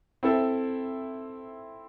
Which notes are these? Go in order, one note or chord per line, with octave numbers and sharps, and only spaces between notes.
C4 E4 A4 C5 E5